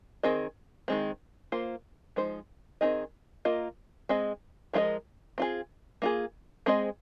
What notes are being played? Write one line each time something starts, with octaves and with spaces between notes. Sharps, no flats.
D#3 C4 G#4 D#5
D#3 G#3 C4
A#3 F4 C5
F3 G#3 D#4 C5
D#3 C4 D#4 G#4 D#5
A#3 F4 A#4 D#5
G#3 C4 G#4 D#5
F3 G#3 F4 A#4 D#5
C4 F4 G#4
A#3 F4 G#4
G#3 C4 G#4 C5 D#5